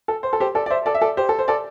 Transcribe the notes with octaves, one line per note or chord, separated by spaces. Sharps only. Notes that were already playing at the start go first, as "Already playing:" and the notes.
A4
C5
A4
G4 C5
A4 D5
D5
C5 E5
A4 D5
E5
A4 D5
G4 C5
A4
C5
A4 D5